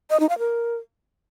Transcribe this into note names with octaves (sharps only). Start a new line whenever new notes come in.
D#5
D#4
F5
A#4